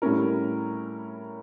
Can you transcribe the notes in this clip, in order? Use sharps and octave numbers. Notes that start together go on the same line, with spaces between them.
A2 G3 C#4 E4 A#4